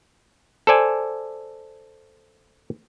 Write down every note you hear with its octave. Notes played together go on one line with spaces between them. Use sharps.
A4 C5 D5 G#5